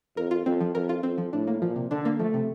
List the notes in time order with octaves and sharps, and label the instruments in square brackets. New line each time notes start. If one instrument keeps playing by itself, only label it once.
[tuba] F2 [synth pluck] A#4
[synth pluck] F4
[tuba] F2 [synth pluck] C4
[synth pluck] F3
[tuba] F2 [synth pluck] A#4
[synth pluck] F4
[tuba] F2 [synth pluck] C4
[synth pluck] F3
[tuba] A2 [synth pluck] D4
[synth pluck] A#3
[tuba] A#2 [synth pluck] F3
[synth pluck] C3
[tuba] D3 [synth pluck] D4
[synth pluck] A#3
[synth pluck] F3 [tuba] A3
[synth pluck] C3